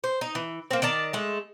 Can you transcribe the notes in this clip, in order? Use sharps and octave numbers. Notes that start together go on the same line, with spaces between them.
C5
D#4
E3
A#3 C4
D#3 D5 A5 A#5
G#3 A3